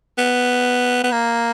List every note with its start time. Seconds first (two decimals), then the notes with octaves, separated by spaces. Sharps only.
0.18 B3
1.04 B3
1.12 A#3